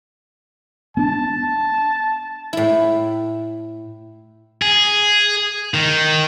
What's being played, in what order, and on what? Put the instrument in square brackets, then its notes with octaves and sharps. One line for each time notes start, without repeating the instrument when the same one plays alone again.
[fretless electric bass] B3 D4 [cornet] A5
[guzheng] A2 E4
[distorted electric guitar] G#4
D#3